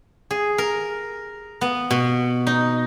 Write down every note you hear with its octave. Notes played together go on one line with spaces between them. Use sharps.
G#4
A#4
B3
B2
D#4